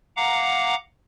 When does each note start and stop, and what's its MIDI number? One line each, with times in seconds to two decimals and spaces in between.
0.16 0.75 77
0.16 0.75 78
0.16 0.75 82
0.16 0.75 86